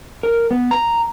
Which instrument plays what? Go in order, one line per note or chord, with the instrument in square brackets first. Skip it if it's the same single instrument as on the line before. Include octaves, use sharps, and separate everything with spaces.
[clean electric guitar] A#4
B3
A#5